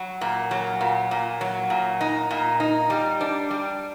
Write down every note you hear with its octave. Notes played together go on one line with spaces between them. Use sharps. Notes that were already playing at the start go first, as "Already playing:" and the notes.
Already playing: F#3
A#2
F#3
A#2
A#2
F#3
A#2
D#4
A#2
D#4
G3
D4
G3